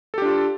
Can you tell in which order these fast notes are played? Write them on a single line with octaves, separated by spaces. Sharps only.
A4 G4 D4 F4